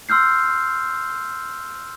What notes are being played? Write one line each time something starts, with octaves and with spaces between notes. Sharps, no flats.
C6 E6 F6 G6 C7